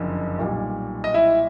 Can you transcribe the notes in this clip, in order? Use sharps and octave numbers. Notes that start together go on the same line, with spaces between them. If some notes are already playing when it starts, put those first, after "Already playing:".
Already playing: F#1 F2 D3 F3
B1 A#2 G3
D#5
E4 E5